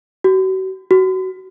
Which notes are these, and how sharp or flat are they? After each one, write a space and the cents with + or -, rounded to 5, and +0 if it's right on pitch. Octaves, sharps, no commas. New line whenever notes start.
F#4 +40
F#4 +20